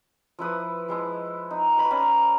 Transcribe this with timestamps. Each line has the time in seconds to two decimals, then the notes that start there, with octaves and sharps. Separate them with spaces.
0.39 F3 E4 B4 D#6
0.88 F3 G#3 E4
1.51 D#4
1.78 B4 B5 C#6
1.90 C#4 D5 A#5 B5